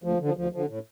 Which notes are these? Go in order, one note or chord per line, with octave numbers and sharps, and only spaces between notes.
D2 F3
D3 F3
D2 F3
D3 F3
A2